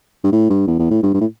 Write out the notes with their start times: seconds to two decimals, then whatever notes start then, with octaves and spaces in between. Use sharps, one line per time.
0.24 G2
0.32 A2
0.50 G2
0.68 E2
0.79 E2
0.90 A2
1.03 G2
1.14 G2
1.21 A2